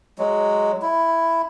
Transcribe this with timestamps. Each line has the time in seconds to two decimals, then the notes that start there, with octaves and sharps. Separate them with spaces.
0.18 F#3 G#3
0.82 E4